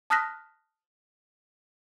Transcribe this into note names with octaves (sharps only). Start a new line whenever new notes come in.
A5 D#6 F6 F#6 A#6 B6